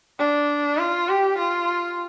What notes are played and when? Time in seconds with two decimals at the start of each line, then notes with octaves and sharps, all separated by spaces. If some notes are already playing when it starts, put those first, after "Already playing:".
0.19 D4
0.78 F4
1.09 G4
1.38 F4